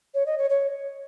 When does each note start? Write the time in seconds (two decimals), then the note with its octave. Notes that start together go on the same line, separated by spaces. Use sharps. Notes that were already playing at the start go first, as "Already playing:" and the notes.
0.14 C#5
0.26 D#5
0.38 C#5
0.50 C#5